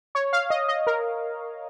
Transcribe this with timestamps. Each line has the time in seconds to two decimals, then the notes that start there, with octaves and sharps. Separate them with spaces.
0.15 C#5
0.33 F5
0.50 D#5
0.68 D#5
0.87 A#4